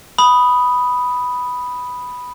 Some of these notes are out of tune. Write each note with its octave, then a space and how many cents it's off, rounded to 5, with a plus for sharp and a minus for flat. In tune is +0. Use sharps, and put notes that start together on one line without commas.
B5 +0 D#6 +0